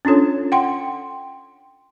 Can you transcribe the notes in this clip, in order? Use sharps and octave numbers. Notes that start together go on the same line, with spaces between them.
C#4 D4 F4 A4 C#5
F#5 G5 C6